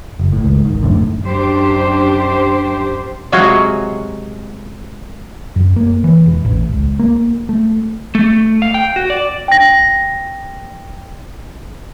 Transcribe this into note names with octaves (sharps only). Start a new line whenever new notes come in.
F#1
A2
C#2
G#1 D#3
F1 F#2 A2 D3
F#2 D4 G4 C5
C3 F#3 G#3 F4 F#4 G#4
F#2
A#3
E3
E1
A1
C#2
A#3
A3
A3
F5
G5
F#4
D5
G5 A#6